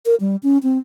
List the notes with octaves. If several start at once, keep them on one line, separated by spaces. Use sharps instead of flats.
A#4
G3
C#4
C4